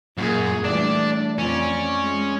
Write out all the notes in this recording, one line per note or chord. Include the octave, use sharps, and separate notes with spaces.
F#2 A#2 G#4
E3 G3 A3 D4
F2 C#4 D5
G#3